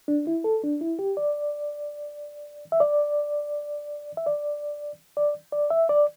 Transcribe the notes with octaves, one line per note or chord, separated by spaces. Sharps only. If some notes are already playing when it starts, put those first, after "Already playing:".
D4
E4
A4
D4
E4
G4
D5
E5
D5
E5
D5
D5
D5
E5
D5